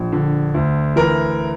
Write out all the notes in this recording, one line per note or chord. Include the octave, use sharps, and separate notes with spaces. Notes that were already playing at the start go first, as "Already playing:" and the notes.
Already playing: A#1
D3
D2
E3 A#4